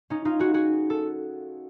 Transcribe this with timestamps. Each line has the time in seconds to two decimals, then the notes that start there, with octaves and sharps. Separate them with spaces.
0.10 C#4 D#4
0.25 D#4 F4
0.39 F#4 G#4
0.54 F#4 G#4
0.90 A4